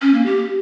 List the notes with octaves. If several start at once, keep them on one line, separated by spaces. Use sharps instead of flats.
C#4
A#3
G4